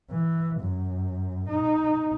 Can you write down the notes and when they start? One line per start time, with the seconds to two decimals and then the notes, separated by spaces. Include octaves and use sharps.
0.11 E3
0.60 F#2
1.49 D#4